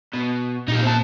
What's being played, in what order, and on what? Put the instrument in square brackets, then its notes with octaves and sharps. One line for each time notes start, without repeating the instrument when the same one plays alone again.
[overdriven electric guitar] B2
[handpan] A#2 [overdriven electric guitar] D#4 G4
[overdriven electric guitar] C4 A5